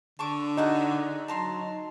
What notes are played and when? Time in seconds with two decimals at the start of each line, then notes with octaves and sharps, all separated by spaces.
0.19 D3 A5 C#6 D6
0.57 D#4 F#4 G#4 F#5
1.28 F#3 A5 A#5 C6